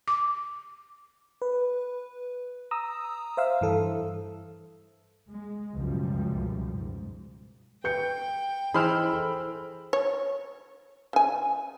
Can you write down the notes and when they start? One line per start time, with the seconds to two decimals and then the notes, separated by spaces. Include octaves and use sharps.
0.08 D6
1.42 B4
2.71 A#5 D#6 E6
3.37 C5 E5 F5 E6
3.61 G2 E3 A4
5.29 G#3
5.71 C#2 F#2 B2 F3 G3
6.73 G#2
7.84 B4 G5 G6 C#7
8.74 E3 G#4 C5 D#5 B5 E6 F6
9.13 A4
9.93 C#5
11.13 C#3 G#5